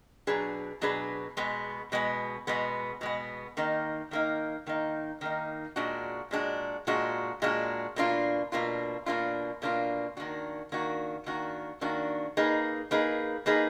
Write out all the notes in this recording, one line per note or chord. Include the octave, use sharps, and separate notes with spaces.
B2 F#3 D4 G#4 B4
B2 F#3 D4 G#4 B4
B2 G#3 B3
B2 G#3 B3
B2 G#3 B3
B2 G#3 B3
D#3 A#3 D#4
D#3 A#3 D#4
D#3 A#3 D#4
D#3 A#3 D#4
A#2 G#3 D4 F#4
A#2 G#3 D4 F#4
A#2 G#3 D4 F#4
A#2 G#3 D4 F#4
B2 A#3 D4 F4
B2 A#3 D4 F4
B2 A#3 D4 F4
B2 A#3 D4 F4
D#3 A#3 D4 F#4
D#3 A#3 D4 F#4
D#3 A#3 D4 F#4
D#3 A#3 D4 F#4
A#3 D#4 G#4 B4
A#3 D#4 G#4 B4
A#3 D#4 G#4 B4